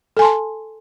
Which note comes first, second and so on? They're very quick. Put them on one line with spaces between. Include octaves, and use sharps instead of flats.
A4 G#5 C6 A5